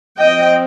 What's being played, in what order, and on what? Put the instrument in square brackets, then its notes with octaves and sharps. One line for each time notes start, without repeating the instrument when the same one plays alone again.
[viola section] F3 C4 D#5 G5